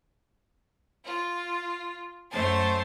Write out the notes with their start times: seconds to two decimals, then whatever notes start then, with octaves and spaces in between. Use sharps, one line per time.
1.04 F4
2.31 F#2 A3 C5 C#5 A5